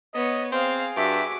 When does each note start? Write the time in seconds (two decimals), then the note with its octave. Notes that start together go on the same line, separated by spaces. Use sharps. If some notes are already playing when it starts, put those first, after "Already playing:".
0.14 B3 C#5 D#5
0.52 C4 G#4 F5
0.96 G2 F#4 E5 D6